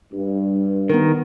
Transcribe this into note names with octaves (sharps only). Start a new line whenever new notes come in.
G2
D#3 B3 A#4